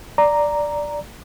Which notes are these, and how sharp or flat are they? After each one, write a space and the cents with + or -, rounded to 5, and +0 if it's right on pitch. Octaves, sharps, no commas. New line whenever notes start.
D5 +0 A#5 +0